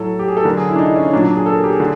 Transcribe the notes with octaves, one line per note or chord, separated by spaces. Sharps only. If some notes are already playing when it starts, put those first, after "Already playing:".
Already playing: A2 F#3 A4
G4
G#4
A4
D3 F#3 A#4
G#4
E4
D4
D#4
C#4
A#2 F#3 D4
D4
G#4
A4
A#4
G4
G#4
D3